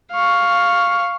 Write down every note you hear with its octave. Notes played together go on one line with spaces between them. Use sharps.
F5 C#6